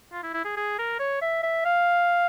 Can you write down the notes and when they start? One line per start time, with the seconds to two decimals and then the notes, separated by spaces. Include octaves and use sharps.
0.12 F4
0.23 E4
0.34 E4
0.45 G#4
0.57 G#4
0.78 A#4
0.99 C#5
1.22 E5
1.43 E5
1.65 F5